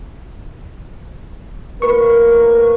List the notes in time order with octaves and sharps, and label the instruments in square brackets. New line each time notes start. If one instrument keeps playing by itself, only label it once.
[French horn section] A2 A#3 A#4 [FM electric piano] B4 C#6